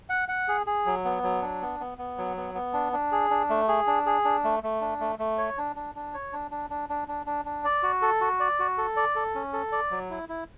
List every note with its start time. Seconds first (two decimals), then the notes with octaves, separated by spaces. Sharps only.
0.09 F#5
0.29 F#5
0.48 G#4
0.67 G#4
0.86 F#3
1.05 B3
1.23 F#3
1.42 D4
1.61 B3
1.80 B3
1.98 B3
2.18 F#3
2.37 B3
2.55 B3
2.73 D4
2.93 D4
3.12 G#4
3.30 D4
3.50 A3
3.68 G#4
3.87 D4
4.06 G#4
4.25 D4
4.44 A3
4.63 A3
4.81 D4
5.00 A3
5.19 A3
5.38 C#5
5.58 D4
5.76 D4
5.95 D4
6.14 C#5
6.33 D4
6.51 D4
6.70 D4
6.89 D4
7.08 D4
7.26 D4
7.45 D4
7.64 D5
7.83 F#4
8.02 A4
8.21 F#4
8.40 D5
8.59 F#4
8.78 A4
8.97 D5
9.15 A4
9.35 C#4
9.53 A4
9.72 D5
9.91 F#3
10.10 E4
10.29 E4